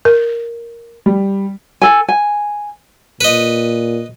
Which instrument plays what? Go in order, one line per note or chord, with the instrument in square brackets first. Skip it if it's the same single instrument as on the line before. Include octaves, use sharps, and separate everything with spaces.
[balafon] A#4
[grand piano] G3
[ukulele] A4 G#5
G#5
[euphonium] A#2 [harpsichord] B4 D#5